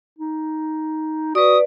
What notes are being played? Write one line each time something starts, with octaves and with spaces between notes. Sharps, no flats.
D#4
F#4 B4 D5 D#6